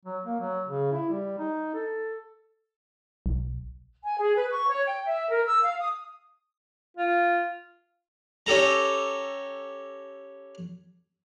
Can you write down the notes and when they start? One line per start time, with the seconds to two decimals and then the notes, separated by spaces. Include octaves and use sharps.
0.05 F#3
0.25 A#3
0.40 F#3
0.67 C#3
0.92 E4
1.10 G3
1.38 D#4
1.74 A4
3.26 B1
4.03 G#5
4.18 G#4
4.35 B4
4.49 C#6
4.68 C#5
4.85 G5
5.05 E5
5.30 A#4
5.46 E6
5.62 F5
5.80 D#6
6.97 F4
8.46 C#4 G4 A4 A#5